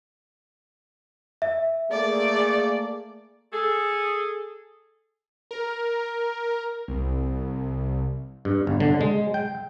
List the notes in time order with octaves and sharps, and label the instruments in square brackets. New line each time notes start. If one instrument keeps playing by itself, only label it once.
[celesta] E5
[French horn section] A3 A#3 G#4 [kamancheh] D5
[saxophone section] G#4 A4
[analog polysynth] A#4
C2
[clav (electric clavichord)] G2
G1
D3
G#3
G5